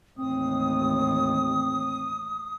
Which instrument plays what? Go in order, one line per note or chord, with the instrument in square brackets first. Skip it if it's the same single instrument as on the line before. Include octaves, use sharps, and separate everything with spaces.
[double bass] A1 D#2 [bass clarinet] C4 [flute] D#6